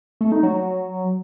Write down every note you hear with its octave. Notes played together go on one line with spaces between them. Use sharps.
A3
D#4
F#3
F#3